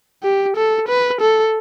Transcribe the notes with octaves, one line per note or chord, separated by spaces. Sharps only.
G4
A4
B4
A4